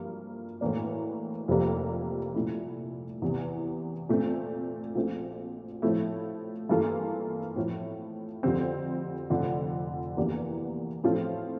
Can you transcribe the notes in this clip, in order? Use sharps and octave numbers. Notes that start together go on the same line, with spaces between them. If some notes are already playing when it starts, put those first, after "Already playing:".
Already playing: G2 F3 A#3
A2 E3 A#3 D4
F1 F2 C3 G3 A#3
C2 A#2 A3 E4
E2 C3 E3
A#2 A3 C4
A#1 A#2 F3 A3 C4
A2 F3 A3 E4
G2 E3 A#3 F4 A4
A2 F3 A3
F2 D3 G3 C4
F1 F2 D3 F3
E2 E3 A#3 D4 G4
A2 F3 C4 F4 A4